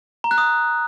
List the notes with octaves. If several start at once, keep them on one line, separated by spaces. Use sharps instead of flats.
A#5
F#6
D#6